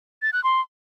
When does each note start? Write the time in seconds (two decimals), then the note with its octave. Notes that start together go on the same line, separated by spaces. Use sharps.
0.22 A6
0.33 F#6
0.44 C6